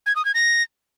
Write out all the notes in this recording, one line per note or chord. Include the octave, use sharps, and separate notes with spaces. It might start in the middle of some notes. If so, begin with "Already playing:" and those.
G#6
D#6
G#6
A#6